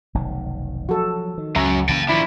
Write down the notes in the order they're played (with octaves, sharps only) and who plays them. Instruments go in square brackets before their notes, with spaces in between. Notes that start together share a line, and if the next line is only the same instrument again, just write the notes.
[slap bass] F1 B1 D#3
[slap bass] F3 F#3 [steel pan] F#4 A4
[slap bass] D#3
[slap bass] C#2 [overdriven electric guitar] F#3 C#4 [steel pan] E5 A#5
[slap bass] C#3 E3 A#3 [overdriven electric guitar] G5 A5
[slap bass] D#3 [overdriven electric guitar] F3 D4 [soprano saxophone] E4